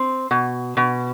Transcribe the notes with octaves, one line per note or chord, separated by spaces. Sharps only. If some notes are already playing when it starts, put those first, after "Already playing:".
Already playing: C4
B2
B2